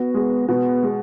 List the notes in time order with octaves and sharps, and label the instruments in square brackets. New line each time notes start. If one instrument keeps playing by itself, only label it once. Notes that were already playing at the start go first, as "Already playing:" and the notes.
Already playing: [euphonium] B3 [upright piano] F#4
[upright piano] G#3
[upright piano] B2 [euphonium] B3
[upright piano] G#3